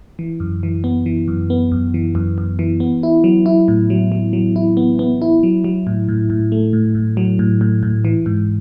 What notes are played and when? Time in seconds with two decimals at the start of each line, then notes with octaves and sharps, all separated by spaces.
0.19 E3
0.40 F#2
0.63 E3
0.84 B3
1.06 E3
1.28 F#2
1.50 B3
1.72 F#2
1.94 E3
2.15 F#2
2.38 F#2
2.59 E3
2.80 B3
3.03 E4
3.24 F#3
3.46 E4
3.68 A2
3.90 F#3
4.12 F#3
4.33 F#3
4.56 E4
4.77 B3
4.99 B3
5.22 E4
5.43 F#3
5.64 F#3
5.87 A2
6.09 A2
6.30 A2
6.52 A3
6.73 A2
6.95 A2
7.17 F#3
7.39 A2
7.61 A2
7.83 A2
8.05 E3
8.26 G#2